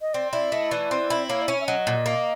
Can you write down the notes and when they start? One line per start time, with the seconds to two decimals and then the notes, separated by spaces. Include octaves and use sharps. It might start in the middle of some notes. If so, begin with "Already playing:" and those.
0.01 D#5
0.14 C4 D5
0.32 E4 D5
0.52 A3 D#5
0.71 E3 D5
0.91 C4
1.10 E4
1.28 A#3 C#5
1.42 D5
1.48 C#4 C#5
1.61 E5
1.67 F#3 D#5
1.87 A#2
2.06 A#3